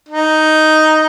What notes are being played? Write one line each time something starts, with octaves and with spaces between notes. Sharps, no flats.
D#4